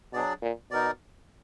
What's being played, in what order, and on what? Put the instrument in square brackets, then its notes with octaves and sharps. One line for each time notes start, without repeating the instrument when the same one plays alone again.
[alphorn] B2 [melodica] F#3 D4 G#4 D5
[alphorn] A#2
[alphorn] B2 [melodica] D#4 A#4 D5